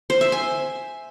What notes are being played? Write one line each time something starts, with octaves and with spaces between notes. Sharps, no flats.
C5
E5
G#5